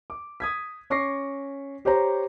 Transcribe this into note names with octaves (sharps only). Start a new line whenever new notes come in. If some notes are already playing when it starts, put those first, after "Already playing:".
D6
D#6 G#6 B6
C#4 C#6 D6 A#6 C7
G4 C5 C#5 A#5